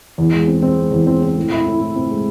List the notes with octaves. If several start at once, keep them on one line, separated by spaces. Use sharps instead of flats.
E2
G#3
C4
C4
G#3
E2
C4
C4
A2
E4
A2
A2
C4
G#3